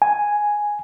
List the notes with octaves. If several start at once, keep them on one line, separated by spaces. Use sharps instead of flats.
G#5